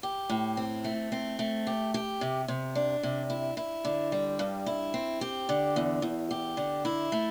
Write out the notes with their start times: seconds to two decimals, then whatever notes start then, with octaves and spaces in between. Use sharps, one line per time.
0.03 G4
0.30 A2
0.57 C4
0.84 A3
1.12 C4
1.39 A3
1.67 G4
1.94 G4
2.21 C3
2.48 C3
2.75 D4
3.03 C3
3.30 E4
3.57 E4
3.85 D3
4.12 G3
4.39 G2
4.66 E4
4.94 C4
5.21 G4
5.49 D3
5.76 E2
6.02 E2
6.31 G4
6.57 D3
6.85 E4
7.12 A3